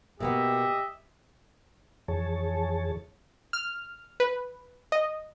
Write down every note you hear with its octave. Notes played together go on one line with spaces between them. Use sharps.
B2 A#3 B3 G4 D#5 E5
F2 E3 G#4 C#5 A5
F6
B4
D#5